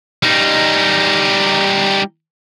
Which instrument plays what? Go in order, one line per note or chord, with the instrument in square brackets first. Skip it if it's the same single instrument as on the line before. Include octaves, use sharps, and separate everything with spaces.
[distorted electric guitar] G3 D#4